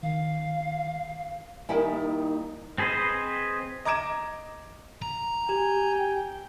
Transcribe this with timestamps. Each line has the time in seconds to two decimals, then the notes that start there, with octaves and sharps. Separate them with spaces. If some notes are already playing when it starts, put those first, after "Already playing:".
0.03 D#3 F5
1.69 D#3 G3 A#3 D#4 E4 A#4 G5 G#5
2.78 C4 G#4 B4 C5 D#5
3.85 D#5 A#5 D6 G#6 D7 E7
5.02 A#5
5.49 G4 G5 G#5